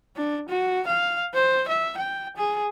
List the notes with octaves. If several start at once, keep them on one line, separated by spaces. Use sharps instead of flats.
D4
F#4
F5
C5
E5
G5
G#4